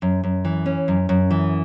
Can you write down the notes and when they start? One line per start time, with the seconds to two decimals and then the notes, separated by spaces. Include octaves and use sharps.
0.02 F#2
0.24 F#2
0.45 E3
0.66 C#4
0.88 F#2
1.09 F#2
1.31 E3